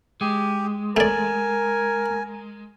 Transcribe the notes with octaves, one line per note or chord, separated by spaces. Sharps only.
G#3 G4
A3 A#4 D5 G#5